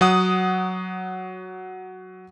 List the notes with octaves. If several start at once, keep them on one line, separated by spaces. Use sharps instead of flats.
F#3 F#5 D#6